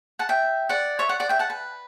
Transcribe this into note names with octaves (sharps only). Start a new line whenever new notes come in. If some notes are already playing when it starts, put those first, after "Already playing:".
F#5 A5
E5 G5
D5 F#5
C#5 E5
D5 F#5
D5 F#5
E5 G5
F#5 A5
B4